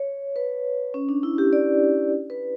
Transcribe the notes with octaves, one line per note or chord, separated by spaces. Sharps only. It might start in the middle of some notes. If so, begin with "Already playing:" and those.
Already playing: C#5
B4
C#4
D4
E4
G4
D5
B4